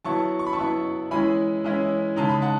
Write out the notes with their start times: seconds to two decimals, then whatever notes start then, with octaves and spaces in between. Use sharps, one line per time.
0.05 F#3 B3 E4 A5 C#6
0.39 C#6
0.47 B5
0.53 A5 C#6
0.58 F#3 B3 E4
1.11 E3 G#3 C#4 E4 G#5 B5
1.64 E3 G#3 C#4 E4
2.16 C#3 G#3 D#4 A5
2.29 B5
2.42 F#5 A5